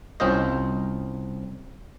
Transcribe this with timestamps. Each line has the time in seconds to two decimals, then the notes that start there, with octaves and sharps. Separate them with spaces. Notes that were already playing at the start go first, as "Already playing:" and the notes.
0.20 C2 C4 C#4 F4 C5 D#5